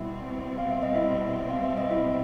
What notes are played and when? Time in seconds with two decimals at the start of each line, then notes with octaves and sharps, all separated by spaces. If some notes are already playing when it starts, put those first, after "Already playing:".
Already playing: B2 G3 C4 E4 E5
0.58 F5
0.70 E5
0.83 D#5
0.95 E4 E5
1.50 F5
1.64 E5
1.78 D#5
1.91 E4 E5